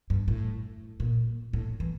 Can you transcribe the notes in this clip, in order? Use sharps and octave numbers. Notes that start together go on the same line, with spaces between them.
G2
A2
A#2
A2
E3